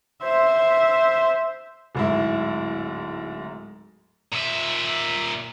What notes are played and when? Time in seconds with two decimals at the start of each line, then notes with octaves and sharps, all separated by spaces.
0.23 C5 E5
1.95 D1 G#2 E4
4.32 A#2 E5